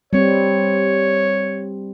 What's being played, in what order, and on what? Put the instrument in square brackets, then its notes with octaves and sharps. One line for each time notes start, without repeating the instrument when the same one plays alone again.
[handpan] G3 C4 [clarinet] C#5